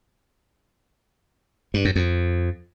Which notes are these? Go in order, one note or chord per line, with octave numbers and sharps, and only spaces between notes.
G2
F#2
F2